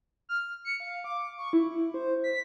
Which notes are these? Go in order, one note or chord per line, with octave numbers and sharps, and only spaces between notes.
F6
C#7
F5
D6
C#6
E4
C5
B6